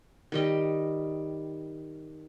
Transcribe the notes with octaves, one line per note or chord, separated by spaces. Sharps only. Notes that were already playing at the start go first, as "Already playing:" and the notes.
D#3 G3 D#5